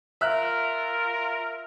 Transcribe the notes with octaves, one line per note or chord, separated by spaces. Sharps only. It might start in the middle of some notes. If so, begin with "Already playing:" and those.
F4 A#4 E5 F6 F#6